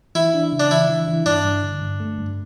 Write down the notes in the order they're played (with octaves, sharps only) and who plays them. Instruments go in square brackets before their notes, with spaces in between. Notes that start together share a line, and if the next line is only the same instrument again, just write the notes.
[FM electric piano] E3 [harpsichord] E4
[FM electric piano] D4
C#3
[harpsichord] D4
[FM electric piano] E3 [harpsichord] E4
[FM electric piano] E3
E3
[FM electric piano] G2 [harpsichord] D4
[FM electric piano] G2
D3
G2
A3
G2